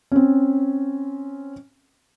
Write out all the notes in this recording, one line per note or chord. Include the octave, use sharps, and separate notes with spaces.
C4 C#4